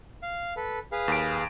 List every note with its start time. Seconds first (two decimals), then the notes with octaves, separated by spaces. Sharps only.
0.22 F5
0.56 A4 B4
0.92 G#4 B4 F5
1.08 D#2 D7